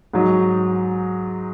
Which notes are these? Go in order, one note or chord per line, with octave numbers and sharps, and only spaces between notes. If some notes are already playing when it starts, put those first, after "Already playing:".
G#2 F#3 D#4